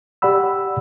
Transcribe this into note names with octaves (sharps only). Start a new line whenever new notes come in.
G4 D5 F#5 B5 E6